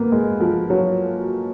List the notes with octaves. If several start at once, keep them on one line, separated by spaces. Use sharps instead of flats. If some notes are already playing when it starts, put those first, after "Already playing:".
Already playing: A#3 B3
G#3
F3
F#3